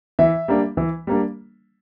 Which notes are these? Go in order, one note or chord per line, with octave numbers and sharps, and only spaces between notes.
E3 E5
G3 A#3 D4
E3
G3 A#3 D4